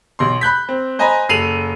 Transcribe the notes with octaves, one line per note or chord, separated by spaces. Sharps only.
B1 C6
B5 F#6 G6 B6
C4
C5 D#5 G#5 A#5 B5
F#1 A4 C7 D#7 F7 F#7